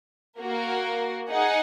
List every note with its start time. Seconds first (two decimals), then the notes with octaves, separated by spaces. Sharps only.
0.40 A#3 F#4 A#4
1.29 D#4 G#4 F#5